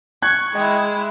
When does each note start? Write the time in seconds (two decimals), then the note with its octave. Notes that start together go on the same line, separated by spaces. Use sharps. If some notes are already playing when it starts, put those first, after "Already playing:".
0.22 C#6 F#6 G#6
0.55 G#3 E4 D#5 G5